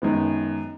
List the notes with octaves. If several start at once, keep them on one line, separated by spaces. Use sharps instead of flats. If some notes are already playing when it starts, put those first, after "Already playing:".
F#2 D#3 G#3 B3